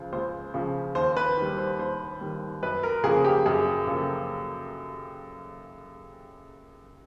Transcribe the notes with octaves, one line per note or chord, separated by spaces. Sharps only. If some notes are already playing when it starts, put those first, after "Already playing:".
Already playing: C#2 C#3 F3
C#2 C5
C#3 F3
D#2 C5
B4
D#3 G3
C5
D#2 C5
D#3 G3
F#2 B4
A#4
C#3 F3 A#3 G#4
G4
F#2 G#4
C#3 F3 A#3 A4